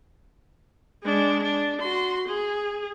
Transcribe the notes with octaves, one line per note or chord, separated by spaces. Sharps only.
G#3 D4
D4
F#4 C6
G#4